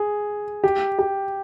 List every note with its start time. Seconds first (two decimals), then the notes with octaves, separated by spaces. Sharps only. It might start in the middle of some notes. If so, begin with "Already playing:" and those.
Already playing: G#4
0.64 G4
0.99 G4